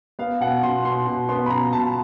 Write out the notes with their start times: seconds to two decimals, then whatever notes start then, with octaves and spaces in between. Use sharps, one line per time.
0.19 B3 F5
0.40 B2 F#5
0.63 B2 C6
0.85 B2 C6
1.07 B2
1.29 B3 C6
1.46 B5
1.50 B2 A#5
1.73 B2 A5